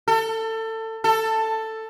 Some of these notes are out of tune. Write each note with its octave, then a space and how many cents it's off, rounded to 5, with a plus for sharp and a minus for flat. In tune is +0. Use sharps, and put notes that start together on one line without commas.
A4 +25
A4 +10